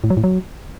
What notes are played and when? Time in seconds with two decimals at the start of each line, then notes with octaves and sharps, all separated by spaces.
0.04 A2
0.10 F#3
0.17 A2
0.24 F#3